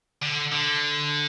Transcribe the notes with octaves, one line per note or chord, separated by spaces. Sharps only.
D3
D3